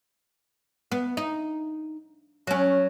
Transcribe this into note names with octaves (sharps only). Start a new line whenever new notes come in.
B3
D#4
F#3 C#4